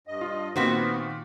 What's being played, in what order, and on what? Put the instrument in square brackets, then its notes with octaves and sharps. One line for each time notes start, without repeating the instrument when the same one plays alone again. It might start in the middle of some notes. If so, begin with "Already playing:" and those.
[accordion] G2 D#5
[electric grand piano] F4
[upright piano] A#2 B6 [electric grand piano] D#3 F4 [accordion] B3 [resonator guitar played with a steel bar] C4 F#4 C5